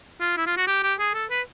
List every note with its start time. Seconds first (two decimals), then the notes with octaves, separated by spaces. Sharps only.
0.20 F4
0.37 E4
0.47 F4
0.57 F#4
0.67 G4
0.83 G4
0.99 G#4
1.14 A4
1.30 B4